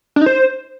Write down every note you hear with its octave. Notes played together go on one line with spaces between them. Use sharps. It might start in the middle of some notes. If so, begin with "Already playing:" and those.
D4
D#4
C5